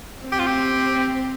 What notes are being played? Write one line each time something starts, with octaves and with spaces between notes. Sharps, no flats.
C4
G4
F4
G4